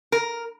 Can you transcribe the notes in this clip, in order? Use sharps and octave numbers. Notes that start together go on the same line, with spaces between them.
A#4